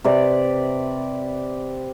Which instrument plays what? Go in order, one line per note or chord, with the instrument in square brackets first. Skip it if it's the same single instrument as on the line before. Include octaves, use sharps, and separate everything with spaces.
[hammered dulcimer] C3 B4 D5